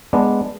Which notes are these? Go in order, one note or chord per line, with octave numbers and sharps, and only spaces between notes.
G#3 B3 D4